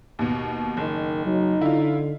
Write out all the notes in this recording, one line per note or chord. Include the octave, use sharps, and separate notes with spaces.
D#2 B2
F#1 D#3
F#3 D#4
D3 E4 F4